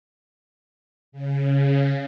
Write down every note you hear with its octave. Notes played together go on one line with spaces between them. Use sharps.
C#3